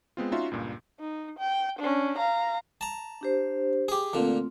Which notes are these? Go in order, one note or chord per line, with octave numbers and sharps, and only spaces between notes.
G#3 B3 C4 F4
C#4 D#4 F4 F#4 E5 C6
C#2 G2 A#2
D#4
G5
C#4 D4
F5 A#5
A5 A#5
D4 G4 C5
G4 G#4
A#2 D3 A3 C4 F4